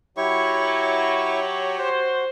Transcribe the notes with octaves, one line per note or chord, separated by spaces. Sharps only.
F#3 E4 G4 C#5 C#6
F#4 C5